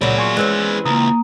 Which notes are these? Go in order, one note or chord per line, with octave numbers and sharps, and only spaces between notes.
C#2 A#2 F#3 G#4 C#5 D5 B5
G#5 C6 C#6
E3 G#3 C4 C#4 F#6
C#2 A#3 A#5 D#6